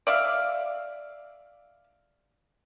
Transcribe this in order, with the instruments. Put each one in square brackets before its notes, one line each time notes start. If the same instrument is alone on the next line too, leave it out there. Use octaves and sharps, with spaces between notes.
[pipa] D5 E5 F5